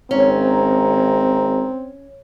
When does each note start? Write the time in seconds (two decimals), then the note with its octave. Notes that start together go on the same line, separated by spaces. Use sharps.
0.11 G#1 C4 C#4 A#5